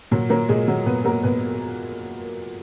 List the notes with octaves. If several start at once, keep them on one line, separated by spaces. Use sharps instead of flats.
A#2 F#3 F#4
F#3 A#3 A#4
A#2 G#3 G#4
F#3
A#2 B3 B4
F#3 A#3 A#4
A#2 B3 B4